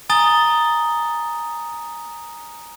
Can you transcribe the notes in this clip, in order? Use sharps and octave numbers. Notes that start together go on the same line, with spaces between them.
G#5 A#5 D#6 A6 G7